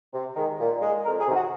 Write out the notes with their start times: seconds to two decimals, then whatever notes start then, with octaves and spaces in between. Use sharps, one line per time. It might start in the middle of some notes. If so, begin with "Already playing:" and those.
0.14 C3
0.36 D#3 G#3
0.60 A#2
0.82 G#3
1.05 F2 A#4
1.20 G#4
1.27 C3 D#3 F#3
1.36 F#4